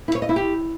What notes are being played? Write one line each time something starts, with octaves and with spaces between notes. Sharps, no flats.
E4
C#5
D#5
E4
G4